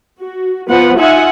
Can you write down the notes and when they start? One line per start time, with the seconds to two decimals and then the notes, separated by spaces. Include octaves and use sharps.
0.20 F#4
0.68 F3 B3 B4 F#5
0.98 D#4 F4 E5 F#5 G#5